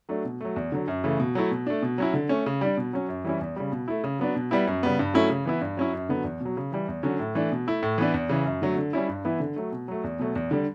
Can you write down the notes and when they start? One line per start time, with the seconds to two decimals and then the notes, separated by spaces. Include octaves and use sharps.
0.09 F#3 A3 D4
0.25 B2
0.41 F#3 A3
0.56 E2
0.72 D3 F#3
0.88 F#2
1.04 C#3 E3 A3
1.20 B2
1.35 F#3 A3 E4
1.51 B2
1.67 A3 D4
1.82 B2
1.98 F#3 C#4 E4
2.14 D3
2.29 A3 C#4
2.46 C#3
2.61 G3 D4
2.77 B2
2.93 F#3 C#4
3.09 F#2
3.25 E3 G3 C#4 E4
3.41 E2
3.56 C#3 G3
3.72 B2
3.88 A3 E4
4.04 C#3
4.19 F#3 B3 D4
4.35 B2
4.51 G3 B3 E4
4.67 F#2
4.83 C#3 G3 B3
4.99 G2
5.14 F#3 A3 C#4 E4
5.30 C#3
5.45 E3 B3 E4
5.61 G2
5.77 F#3 C#4 E4
5.93 F#2
6.09 D3 F#3 B3
6.24 E2
6.40 B2
6.45 F#3
6.57 C#3
6.72 E3 G3
6.88 E2
7.03 D3 F#3 C#4
7.19 A2
7.35 E3 A3 D4
7.52 B2
7.67 A3 E4
7.83 A2
7.98 E3 B3 D4
8.14 E2
8.29 C#3 E3
8.46 F#2
8.62 D3 F#3 A3
8.77 D3
8.93 G3 C#4 E4
9.09 G2
9.25 E3 B3 E4
9.40 D3
9.56 F#3 A3
9.72 B2
9.88 F#3 A3
10.04 E2
10.19 B2 F#3 A3
10.35 E2
10.51 D3 G3